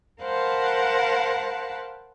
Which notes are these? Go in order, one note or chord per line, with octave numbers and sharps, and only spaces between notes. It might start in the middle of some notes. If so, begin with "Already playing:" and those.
A#4 C5 F5 F#5 A5 B5